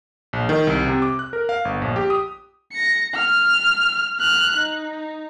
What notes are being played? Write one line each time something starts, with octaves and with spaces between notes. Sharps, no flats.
A#1
D#3
C2
C3
D6
F#6
A#4
F5
G1
A#1
G4
D#6
A#6 C#7
F6
F6 F#6
D#4